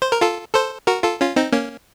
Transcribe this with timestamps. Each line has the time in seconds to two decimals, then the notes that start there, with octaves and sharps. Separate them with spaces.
0.02 C5
0.12 A#4
0.21 F4 A4
0.54 A4 C5
0.87 F#4 A#4
1.03 F4 A4
1.21 C#4 F4
1.36 C4 D#4
1.52 A#3 C#4